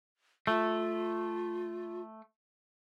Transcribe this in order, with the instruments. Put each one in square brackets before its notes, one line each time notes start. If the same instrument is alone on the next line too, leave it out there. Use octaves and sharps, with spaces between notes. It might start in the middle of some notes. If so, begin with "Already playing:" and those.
[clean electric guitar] A3 [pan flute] F4